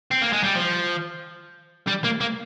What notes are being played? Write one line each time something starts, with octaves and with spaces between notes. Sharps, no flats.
C4
A#3
G#3
G3
F3
G3
A#3
A#3